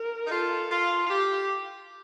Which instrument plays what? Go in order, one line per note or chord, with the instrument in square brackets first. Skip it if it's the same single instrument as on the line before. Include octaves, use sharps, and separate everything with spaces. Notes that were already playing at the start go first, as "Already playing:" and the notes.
Already playing: [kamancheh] A#4
[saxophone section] D#4
[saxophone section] F4 [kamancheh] A4
[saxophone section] F4
F4
G4